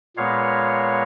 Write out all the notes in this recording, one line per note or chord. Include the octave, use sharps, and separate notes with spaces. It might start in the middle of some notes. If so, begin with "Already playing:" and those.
A#2 G#3 B3 C#5 F5